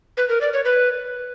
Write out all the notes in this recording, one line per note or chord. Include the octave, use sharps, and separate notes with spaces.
B4
A#4
D5
C#5
B4